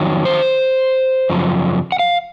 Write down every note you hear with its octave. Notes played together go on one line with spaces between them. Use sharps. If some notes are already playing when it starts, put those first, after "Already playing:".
Already playing: F2 D#3 F#3
C5
F#2 C#3 F3
F#5
F5